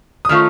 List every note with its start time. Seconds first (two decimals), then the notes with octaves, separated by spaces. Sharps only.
0.25 D#6
0.29 D#3 A3 C#4 F4 F6